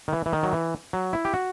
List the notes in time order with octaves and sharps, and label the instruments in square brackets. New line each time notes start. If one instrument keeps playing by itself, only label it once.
[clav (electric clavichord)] D#3
E3
E3
D#3
F#3
E3
F#3
E4
G4
F#4